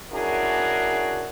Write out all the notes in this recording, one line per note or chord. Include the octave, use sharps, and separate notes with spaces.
C#4 D4 E4 F#4 G#4 A#4